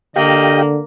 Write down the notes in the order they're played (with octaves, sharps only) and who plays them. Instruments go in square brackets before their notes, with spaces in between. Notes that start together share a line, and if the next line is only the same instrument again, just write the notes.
[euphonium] D3 [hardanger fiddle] A#3 [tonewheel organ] G4 F5 G5 [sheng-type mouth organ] D#5